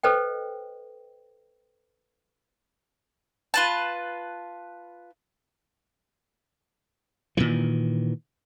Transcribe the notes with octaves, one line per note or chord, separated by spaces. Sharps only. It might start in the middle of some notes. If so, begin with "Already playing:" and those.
A4 B4 C5 D#5 G5
F4 B4 A5
A#2 D#3 E3